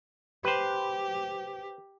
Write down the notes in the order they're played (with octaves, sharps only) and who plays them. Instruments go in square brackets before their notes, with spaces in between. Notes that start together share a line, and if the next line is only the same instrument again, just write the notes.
[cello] G4 [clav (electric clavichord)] B4 C5